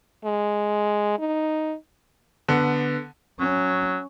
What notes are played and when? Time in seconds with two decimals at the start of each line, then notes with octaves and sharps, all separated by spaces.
0.25 G#3
1.19 D#4
2.48 D3 B3
3.40 F#3 C#4